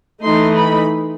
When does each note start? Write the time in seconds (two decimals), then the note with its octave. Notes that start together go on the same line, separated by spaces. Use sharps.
0.23 E3 A3 D#4 C6
0.57 B5